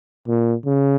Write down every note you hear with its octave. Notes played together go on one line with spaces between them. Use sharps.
A#2
C#3